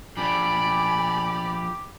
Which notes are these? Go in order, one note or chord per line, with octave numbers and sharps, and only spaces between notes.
F3 D4 G4 D5 G#5 B5